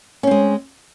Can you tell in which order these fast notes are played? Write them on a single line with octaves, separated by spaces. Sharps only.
C#4 C4 G#3